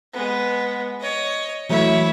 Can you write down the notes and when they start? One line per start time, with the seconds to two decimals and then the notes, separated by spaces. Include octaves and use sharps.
0.13 G#3 B3
1.00 C#5 D#5
1.69 E3 F#3 A3 E4 C#5